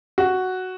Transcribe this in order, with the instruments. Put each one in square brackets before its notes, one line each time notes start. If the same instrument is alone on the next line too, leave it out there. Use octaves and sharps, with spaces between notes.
[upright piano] F#4